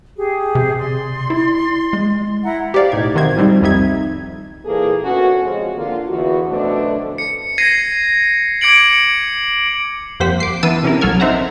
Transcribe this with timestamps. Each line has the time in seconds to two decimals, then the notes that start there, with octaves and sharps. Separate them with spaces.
0.17 G4 G#4
0.55 C3
0.78 D5 C6
1.30 E4
1.93 G#3
2.44 E4 F#5 A#5
2.74 G4 C5 D5 F5
2.92 B1 A2 D#4 G#6
3.15 C3 D#3 F#4 C5 G#6
3.37 D#3 F3 G3 C4 D#4
3.61 C2 F2 G3 D#4 E5 G#6
4.65 A#2 E3 A#3 G#4 A4
5.04 D2 B3 C#4 F#4
5.42 F2 C3 G#3 F4
5.76 D3 A#3 F4
6.08 E2 F#4
6.48 F#2 B2 D3 F3 A3 D4
7.18 C#7
7.58 G#6 A#6 C7 D#7
8.61 D6 G#6 C#7 D7 F#7
10.20 F2 G3 A#3 C5 F#5 B6
10.40 D6 C7
10.63 E3 B3 E4 A5 E6 D#7
10.84 C3 C#4 E4 G4 A#4
11.01 B1 F#3 A4 F6 G#6
11.20 C4 D#4 C5 E5 F#5 A#5